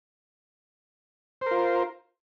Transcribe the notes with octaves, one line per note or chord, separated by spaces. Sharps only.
F4 A#4 C5